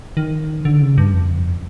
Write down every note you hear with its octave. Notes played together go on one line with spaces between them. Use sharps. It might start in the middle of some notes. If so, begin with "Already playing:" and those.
D#3
D3
C#3
G2
F2